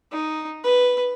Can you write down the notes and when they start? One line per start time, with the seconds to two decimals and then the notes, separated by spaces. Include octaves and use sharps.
0.12 D#4
0.64 B4